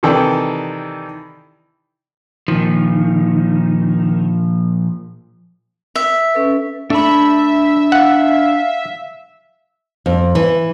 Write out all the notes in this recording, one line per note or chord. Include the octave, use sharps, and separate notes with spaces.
C3 D#3 E3 A4 D5 G5
A#2 D#3 F3
E5
C#4 A4 B4
A3 D4 E5 B5
F5 F#5
F2
E3